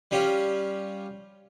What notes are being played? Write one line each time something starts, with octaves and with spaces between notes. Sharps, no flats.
G3 C#4 F4 G4